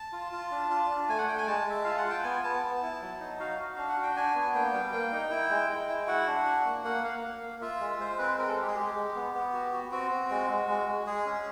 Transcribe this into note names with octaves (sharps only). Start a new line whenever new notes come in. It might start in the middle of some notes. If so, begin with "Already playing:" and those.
Already playing: A5
F4
F4
D4
F4
D4
A3 G#5
F#5
A3 G5
G#5
G#3 A5
G#3 E5
F4 F5
F#5
F4
G5
B3 G#5
B3 A5
B3
E4
F#3
D#4
F#4 F5
F#4
D4 F5
F#5
F#4
G5
D4 G#5
B3
A#3 G5
G3
A#3
D#4
E4
G#3
G#3
E4
F#4 F#5
D4
F#4
A#3
A#3 F#5
A#3 F5
A#3
A#3
F4 E5
G#3
G#3 C5
C4 B4
C4 A#4
A4
G#3 G4
G#4
G#3 G4
G#3
B3
B3
F#4
F#4
C4 F#4
C4
G#3
G#3
G#3
G#3
G#3 G#4
C#4